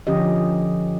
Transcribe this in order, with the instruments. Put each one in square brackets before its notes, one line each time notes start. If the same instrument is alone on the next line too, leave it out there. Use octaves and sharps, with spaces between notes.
[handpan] D3 F3 C#4 G4 D#5